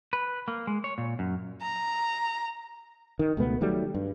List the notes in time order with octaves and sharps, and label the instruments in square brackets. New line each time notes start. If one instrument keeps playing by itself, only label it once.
[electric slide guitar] B4
A#3
G#3
C#5
A#2
F#2
[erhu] A#5
[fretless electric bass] D#3
C#2 B2 A3 B3
D#3 F#3 G3 A3
G2